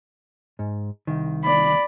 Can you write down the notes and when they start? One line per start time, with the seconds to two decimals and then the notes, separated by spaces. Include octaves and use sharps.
0.59 G#2
1.07 C2 D#3
1.45 D5 B5